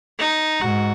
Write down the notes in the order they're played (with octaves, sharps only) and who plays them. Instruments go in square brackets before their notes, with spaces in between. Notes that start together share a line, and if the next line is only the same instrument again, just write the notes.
[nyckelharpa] D#4
[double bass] G#2 [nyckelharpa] F#4